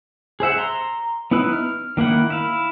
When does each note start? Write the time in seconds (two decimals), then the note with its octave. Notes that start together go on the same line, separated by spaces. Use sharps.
0.40 G#4 C5 E5 F#5
0.58 A#5 C6
1.31 B3 D#4 E4 B4
1.53 F6
1.97 D#3 A#3 E4 F#5
2.30 E4 F5